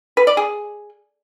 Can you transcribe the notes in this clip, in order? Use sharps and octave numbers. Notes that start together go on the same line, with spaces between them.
B4
D5
G#4